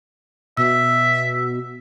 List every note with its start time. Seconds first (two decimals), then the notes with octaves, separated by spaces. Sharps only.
0.57 B2 E5 E6